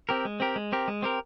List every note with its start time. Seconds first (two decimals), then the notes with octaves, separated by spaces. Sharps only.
0.09 C4 G4 A#4
0.25 G#3
0.40 C4 G4 A#4
0.56 G#3
0.72 C4 G4 A#4
0.88 G#3
1.02 C4 G4 A#4